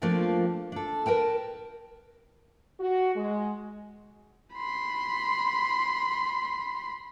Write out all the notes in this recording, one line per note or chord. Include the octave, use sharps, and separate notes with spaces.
F3 A3 A#3 C4 D4 F4
D4 A4
A#4 B4 G5 A5
F#4
G#3
B5 C6